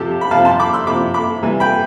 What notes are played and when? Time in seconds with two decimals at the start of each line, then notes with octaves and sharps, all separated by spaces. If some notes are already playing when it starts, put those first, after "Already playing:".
Already playing: C3 F3 G4 A4
0.21 B5
0.31 C3 F3 F5 A5
0.45 A5 C6
0.60 B5 D6
0.73 C6 E6
0.87 C3 F3 B5 D6
1.14 B5 D6
1.42 C3 E3 G3
1.60 G5 B5